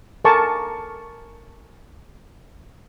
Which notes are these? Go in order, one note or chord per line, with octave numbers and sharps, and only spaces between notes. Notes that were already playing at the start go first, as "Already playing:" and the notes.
A4 A#4 G#5 A5 C#6 D6